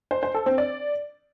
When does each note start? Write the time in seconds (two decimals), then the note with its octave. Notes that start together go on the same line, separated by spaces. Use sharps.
0.11 C5
0.23 C5
0.34 A4
0.46 C4
0.58 D5